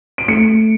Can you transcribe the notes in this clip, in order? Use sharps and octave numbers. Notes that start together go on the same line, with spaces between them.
D7
A3 C#7